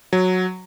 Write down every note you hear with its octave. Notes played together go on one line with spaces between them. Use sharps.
F#3